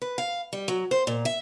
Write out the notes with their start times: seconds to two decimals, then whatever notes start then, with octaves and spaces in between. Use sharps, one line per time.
0.02 B4
0.18 F5
0.53 G3
0.68 F#3
0.91 C5
1.07 A#2
1.25 E5